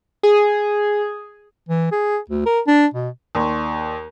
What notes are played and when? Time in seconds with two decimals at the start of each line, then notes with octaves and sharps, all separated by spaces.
0.23 G#4
1.69 E3
1.92 G#4
2.30 D2
2.46 A#4
2.67 D4
2.94 B2
3.35 D#2 D5 C6 C#6